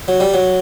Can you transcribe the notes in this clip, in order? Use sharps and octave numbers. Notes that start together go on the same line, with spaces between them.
F#3
G3
F#3